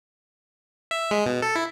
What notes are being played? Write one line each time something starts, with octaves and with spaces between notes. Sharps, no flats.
E5
G#3
B2
A4
E4